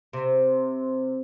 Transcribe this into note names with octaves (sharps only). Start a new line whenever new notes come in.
C3